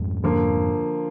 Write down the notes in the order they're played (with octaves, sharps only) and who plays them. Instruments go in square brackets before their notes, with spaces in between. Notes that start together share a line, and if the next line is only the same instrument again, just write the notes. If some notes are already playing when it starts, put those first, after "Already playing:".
Already playing: [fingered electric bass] F2 G#2
[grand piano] D3 F3 A#3 F4